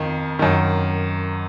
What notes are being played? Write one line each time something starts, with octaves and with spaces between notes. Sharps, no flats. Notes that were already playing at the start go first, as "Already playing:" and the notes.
Already playing: F2 D#3
F#2 D#3